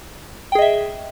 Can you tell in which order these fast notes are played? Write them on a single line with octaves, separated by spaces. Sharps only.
G5 G#4 D#5 E5